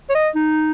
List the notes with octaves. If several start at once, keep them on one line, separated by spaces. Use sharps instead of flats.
C#5
D#5
D#4